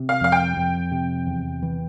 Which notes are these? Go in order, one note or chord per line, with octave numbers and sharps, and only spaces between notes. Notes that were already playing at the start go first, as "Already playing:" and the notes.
Already playing: C3
F5
F2 F5
G5
F2
C3
E2
E3